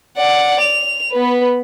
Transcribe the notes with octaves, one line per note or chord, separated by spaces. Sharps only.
D5 F#5
F7
B3 B4